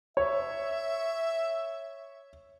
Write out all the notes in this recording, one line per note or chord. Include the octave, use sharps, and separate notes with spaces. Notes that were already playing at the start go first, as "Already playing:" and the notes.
C#5 E5